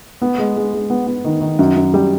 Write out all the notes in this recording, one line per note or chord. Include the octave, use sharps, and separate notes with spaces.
B3
G#3
G#3
G#3
B3
B3
D#3
D#3
F#2
F#2
G3